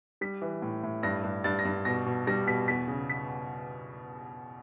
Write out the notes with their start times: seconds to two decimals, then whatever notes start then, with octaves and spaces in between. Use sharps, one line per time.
0.21 G3 B6
0.42 E3
0.62 A2
0.83 A2
1.03 G2 A#6
1.23 G2
1.44 G2 A6
1.59 A#6
1.65 G2
1.85 B2 A#6
2.06 B2
2.27 G3 A#6
2.47 B2 B6
2.68 E2 B6
2.88 C#3
3.10 B6